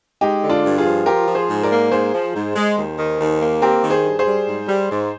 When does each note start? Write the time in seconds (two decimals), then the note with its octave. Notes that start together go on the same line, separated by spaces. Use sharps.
0.21 G#3 D#4 G4
0.43 D3
0.49 D4 F4
0.64 G2
0.78 F4 G#4
0.85 F3
1.06 F4 G4 A#4
1.28 F3
1.35 G#4 C5
1.49 G#2
1.63 A#4 D5
1.71 A#3
1.91 G#2 G#4 C5
2.13 F3
2.34 G#2
2.56 G#3
2.77 D#2
2.99 D#3
3.19 D#2
3.40 A#3
3.62 C4 G4 A#4
3.83 D#3
3.90 G#4 C5
4.05 G2
4.19 G#4 C5
4.26 G3
4.47 G#2
4.68 G3
4.91 G#2